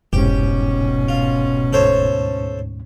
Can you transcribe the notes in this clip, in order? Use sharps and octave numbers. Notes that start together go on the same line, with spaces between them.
F1 C2 G#2 B2 C#4 G4
F4
D2 G#2 A4 C5 C#5